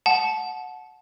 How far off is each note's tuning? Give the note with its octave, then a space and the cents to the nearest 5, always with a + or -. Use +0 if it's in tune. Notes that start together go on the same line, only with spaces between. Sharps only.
F#5 -10 A5 -25